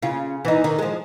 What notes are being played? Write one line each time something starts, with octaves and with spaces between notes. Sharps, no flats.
C#3 F4
E3 D#4
D#3
F3 G#3